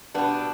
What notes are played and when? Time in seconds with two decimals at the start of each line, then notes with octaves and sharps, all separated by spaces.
0.14 B2 G3 B3 D4